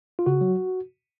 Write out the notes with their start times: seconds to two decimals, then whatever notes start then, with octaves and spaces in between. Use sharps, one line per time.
0.19 F4
0.26 C#3 F#4
0.41 F#3